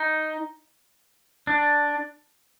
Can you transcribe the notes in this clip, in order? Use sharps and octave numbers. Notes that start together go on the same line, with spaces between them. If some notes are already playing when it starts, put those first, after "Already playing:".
Already playing: D#4
D4